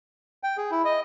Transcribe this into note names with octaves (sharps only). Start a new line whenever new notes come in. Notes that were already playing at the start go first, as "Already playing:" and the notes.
G5
G#4
E4
D#5